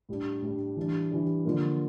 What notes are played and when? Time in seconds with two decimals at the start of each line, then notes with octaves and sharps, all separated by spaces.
0.09 A2 G3 D4
0.42 A2 G3 D4
0.77 E3 G3 D4
1.11 E3 G3 D4
1.44 D3 F3 A#3